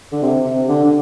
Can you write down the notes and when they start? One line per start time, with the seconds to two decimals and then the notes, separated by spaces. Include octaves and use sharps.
0.12 D3
0.23 C3
0.45 C3
0.69 D3
0.84 D3